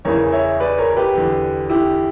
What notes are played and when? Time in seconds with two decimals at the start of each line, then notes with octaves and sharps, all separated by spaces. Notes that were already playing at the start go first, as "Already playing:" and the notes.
0.05 E2 C#3 E3 A#4 C#5
0.32 C#5 E5
0.60 B4 D5
0.78 A#4 C#5
0.92 A#4
0.97 G4 B4
1.14 E2 D3
1.70 E4 G4